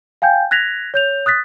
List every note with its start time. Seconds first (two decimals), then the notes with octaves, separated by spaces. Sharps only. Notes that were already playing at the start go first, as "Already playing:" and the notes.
0.22 F5 G5 G#5 G6
0.51 F#6 G#6 A#6 B6 F7
0.94 C#5 G6 F7
1.26 D#6 F#6 A6 B6